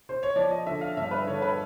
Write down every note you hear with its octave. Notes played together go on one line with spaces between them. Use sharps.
C5
C#5
F3 D5
D#5
D3 E5
F5
G2 E5
B4
D3 C#5
B4